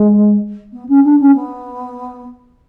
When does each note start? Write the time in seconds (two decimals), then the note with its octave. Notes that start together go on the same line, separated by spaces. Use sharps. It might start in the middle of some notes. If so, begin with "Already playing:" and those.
Already playing: G#3
0.72 B3
0.88 C#4
1.04 D4
1.20 C#4
1.35 B3